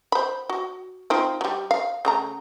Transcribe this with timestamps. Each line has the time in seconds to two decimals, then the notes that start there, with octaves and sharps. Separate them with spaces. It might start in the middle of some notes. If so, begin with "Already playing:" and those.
0.12 C5 B5
0.49 F#4
1.10 C4 D#4 F4
1.41 F#3 G3
1.71 F5
2.05 C#3 A3 A#5